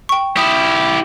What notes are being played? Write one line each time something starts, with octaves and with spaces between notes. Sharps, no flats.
G5 C#6
E4 G4 D#6